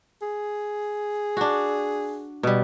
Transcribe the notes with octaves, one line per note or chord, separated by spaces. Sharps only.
G#4
D4 F#4
B2 G3